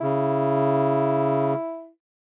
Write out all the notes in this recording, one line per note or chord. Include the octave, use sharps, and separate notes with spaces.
C#3 E4